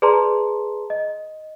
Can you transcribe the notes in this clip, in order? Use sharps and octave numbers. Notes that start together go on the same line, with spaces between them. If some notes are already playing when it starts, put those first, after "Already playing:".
G#4 B4 D5 A5 A#5 C6
D#5